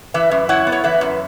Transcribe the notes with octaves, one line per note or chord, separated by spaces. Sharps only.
E3 B4 E5
F#2
E4 C#5 F#5
B3
C#5
E3 B4 E5
F#2